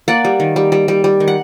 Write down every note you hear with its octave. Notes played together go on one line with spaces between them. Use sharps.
A#3 D5 F#5
G3
D#3
G3
G3
G3
G3
D#3
F#5